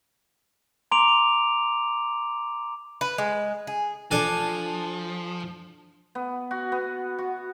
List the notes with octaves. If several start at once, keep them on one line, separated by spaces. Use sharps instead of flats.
A#5 C6 D6 D7 F7
B4
G#3
G#4
F3 D4 A4 G#5
B3
F#4
B3
F#4